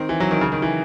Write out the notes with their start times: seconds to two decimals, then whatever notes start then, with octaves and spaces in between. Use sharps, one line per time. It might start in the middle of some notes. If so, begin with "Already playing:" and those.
Already playing: D#3 C4
0.09 E3
0.20 F#3
0.31 D#3
0.41 C#3
0.52 D#3
0.62 E3